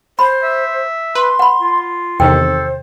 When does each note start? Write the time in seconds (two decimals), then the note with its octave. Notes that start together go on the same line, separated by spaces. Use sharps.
0.19 C5 B5
0.43 E5
1.15 B4 C6
1.39 F#5 B5
1.61 F4
2.20 E2 C3 D#3 A4 C5 G5